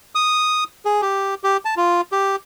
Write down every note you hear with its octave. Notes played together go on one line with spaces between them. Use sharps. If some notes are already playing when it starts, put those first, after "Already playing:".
D#6
G#4
G4
G4
A5
F4
G4